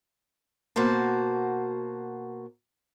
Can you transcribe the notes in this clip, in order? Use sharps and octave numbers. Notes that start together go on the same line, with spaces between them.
B2 A#3 F#4 C5 A5